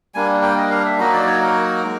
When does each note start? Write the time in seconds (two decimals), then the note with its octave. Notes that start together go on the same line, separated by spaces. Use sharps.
0.15 G3 A#3 D4 G#5
0.42 G5
0.58 D#5
0.71 F5
0.85 E5
0.99 F#3 A#3 D#4 F#4 D#5
1.13 D5
1.27 C#5
1.41 A#4
1.84 G#3